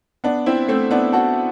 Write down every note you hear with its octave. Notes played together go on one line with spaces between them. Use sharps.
B3 D4
C4 E4
A3 C4
B3 D4
F#4 A4